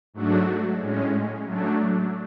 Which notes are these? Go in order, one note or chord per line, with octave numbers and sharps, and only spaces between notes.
G#2 F#3 A3 D4 F#4
A2 G#3 C#4
F#3 A3 D4